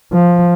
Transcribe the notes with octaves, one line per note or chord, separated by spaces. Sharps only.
F3